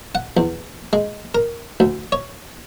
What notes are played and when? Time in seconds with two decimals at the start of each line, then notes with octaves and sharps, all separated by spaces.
0.15 F#5
0.37 E2
0.93 G#3
1.35 A#4
1.80 D2
2.12 C#5